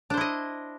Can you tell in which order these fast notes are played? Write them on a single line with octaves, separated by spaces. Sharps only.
D4 C5 E4 D#5